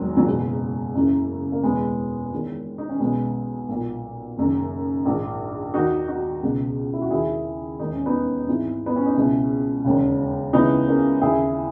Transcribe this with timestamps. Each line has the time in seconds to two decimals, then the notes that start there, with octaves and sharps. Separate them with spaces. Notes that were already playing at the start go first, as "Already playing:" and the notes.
Already playing: E1 E2 D#3 F#3 G#3
0.17 F#3
0.26 F#1 E2 B2 G#3
0.94 F#1 F#2 C#3 E3
1.52 A#3
1.63 E1 E2 B2 G#3 B3
2.31 E1 E2 D#3
2.78 D#4
2.89 C#4
3.00 B1 B2 G#3 B3
3.69 B1 A#2
4.37 F#1 F#2 D#3
5.05 A#1 G#2 D#3
5.74 D#2 D#3 D#4 F#4
6.08 D#4 F#4
6.43 C#2 B2
6.94 E4
7.02 F#4
7.10 D#2 D#3 E4 G#4
7.79 E1 D#2 D#3 D#4
7.93 C#4
8.06 B3 D#4
8.47 G#1 G#2 E3
8.86 B3
8.96 C#4
9.06 D#4
9.16 C#2 B2 C#4 E4
9.84 E1 D#2 C#3
10.53 C#2 C#3 E3 B3 D#4
10.88 A#3 C#4
11.21 D#2 C#3 E3 E4 G#4